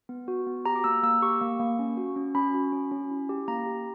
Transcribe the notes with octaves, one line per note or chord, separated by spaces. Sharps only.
B3
F#4
B3
G4 A#5
D6
A#3 E6
A#3 E6
G4 C#6
A#3
A#3
C#4
F#4
C#4
C#4 B5
F#4
C#4
C#4
E4
G4
A#3 A#5
G4